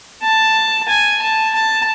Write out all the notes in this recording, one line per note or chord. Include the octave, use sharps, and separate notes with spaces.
A5
G#5
A5
A5